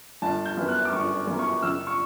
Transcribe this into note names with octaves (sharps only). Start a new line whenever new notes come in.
G1 A5
G6
F#2 E3 B3
F#6
D6
G1 C#6
F#2 E3 B3
C#6
F#1 E6
C#6